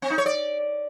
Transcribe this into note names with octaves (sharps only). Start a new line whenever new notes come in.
C4
D#4
C#5
D5